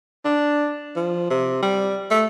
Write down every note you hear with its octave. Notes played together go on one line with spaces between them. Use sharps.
D4
F3
C3
G3
A3